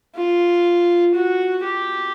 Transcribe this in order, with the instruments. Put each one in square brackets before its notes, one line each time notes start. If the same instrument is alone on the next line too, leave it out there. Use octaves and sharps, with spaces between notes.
[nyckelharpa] F4
F#4
G4